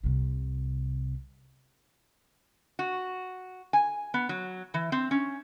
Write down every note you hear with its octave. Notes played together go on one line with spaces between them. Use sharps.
C2 C3
F#4
G#5
B3
F#3
E3
C4
C#4